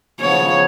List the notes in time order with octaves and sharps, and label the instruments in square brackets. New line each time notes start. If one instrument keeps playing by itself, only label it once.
[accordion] C#3 F3 B3 [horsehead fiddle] C#5